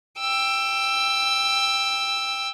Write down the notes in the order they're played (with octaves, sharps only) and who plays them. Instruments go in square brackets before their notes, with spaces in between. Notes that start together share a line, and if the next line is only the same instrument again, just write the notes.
[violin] G5 E6